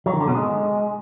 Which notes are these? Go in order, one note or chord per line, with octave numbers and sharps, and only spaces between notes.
F#3
D#3
D3
B2
G#3